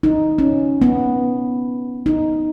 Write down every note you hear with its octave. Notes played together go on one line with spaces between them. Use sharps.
D#4
C#4
B3
D#4